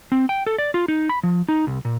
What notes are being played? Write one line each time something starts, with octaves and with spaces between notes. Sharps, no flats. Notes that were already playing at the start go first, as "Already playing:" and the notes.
C4
G5
A4
D5
F4
D#4
B5
F3
D#4
C2
A#2